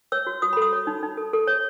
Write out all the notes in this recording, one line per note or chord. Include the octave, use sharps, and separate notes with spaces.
C#5 E6
F#4
F#4 D#6
B5
A4 D#6
C#5
D#4
D#4
A4
A4
C#5